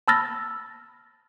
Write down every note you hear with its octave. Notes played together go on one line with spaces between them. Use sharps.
A5 B5 E6 F6 A6 A#6